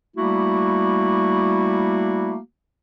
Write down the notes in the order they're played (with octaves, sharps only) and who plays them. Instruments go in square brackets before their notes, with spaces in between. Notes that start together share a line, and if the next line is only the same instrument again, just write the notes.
[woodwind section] G3 A3 A#3 E4 F#4